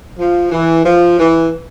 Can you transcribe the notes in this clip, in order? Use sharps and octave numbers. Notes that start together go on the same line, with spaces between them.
F3
E3
F3
E3